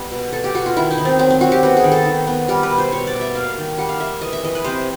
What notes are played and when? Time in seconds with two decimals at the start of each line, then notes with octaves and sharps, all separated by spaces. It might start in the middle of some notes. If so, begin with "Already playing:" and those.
Already playing: G3 B3
0.11 B2
0.33 B2 A4
0.44 G4
0.54 B2 F#4
0.66 F4
0.77 D#3 E4
0.91 D#4
0.98 D#3
1.05 C4
1.19 F#3 C4
1.30 C4
1.41 F#3 F#4
1.52 G4
1.63 B3 F#4
1.77 G#4
1.84 D#3
1.92 A4
2.06 D#3
2.27 B3
2.48 G3 A#4
2.63 B4
2.70 B2
2.78 C5
2.92 B2 C#5
3.07 D5
3.13 B2
3.21 E5
3.35 A#3 F5
3.57 D#3
3.78 G3 F#5
3.89 F5
4.00 A#3 E5
4.22 E3 D#5
4.33 E5
4.43 E3 D#5
4.55 B4
4.64 C3 C5